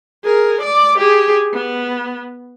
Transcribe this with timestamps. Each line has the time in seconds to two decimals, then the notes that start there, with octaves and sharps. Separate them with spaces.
0.24 G#4 A#4
0.61 D5 D6
0.98 G4 G#4
1.53 B3